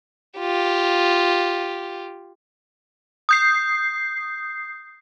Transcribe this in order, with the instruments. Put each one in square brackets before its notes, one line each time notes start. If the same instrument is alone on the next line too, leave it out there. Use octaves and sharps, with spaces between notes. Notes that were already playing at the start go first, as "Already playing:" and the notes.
[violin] F4 G4
[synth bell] D#6 G6 C7